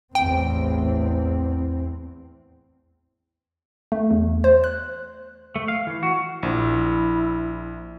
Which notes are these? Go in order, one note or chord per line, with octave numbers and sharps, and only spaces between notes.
A1 E2 C4 G5
A3
E2
C5
F#6
A3
F5
E3
F#4
A#1 E4